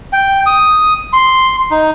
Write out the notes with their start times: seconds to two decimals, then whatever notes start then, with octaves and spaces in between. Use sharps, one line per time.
0.13 G5
0.46 D#6
1.13 C6
1.71 D#4